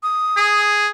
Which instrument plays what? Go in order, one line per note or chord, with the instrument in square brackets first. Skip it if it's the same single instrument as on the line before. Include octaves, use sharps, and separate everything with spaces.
[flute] D#6
[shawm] G#4